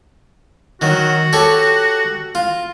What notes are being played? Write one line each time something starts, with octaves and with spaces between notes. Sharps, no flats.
D#3 F#3 F#4
G4 A4 C#5
F4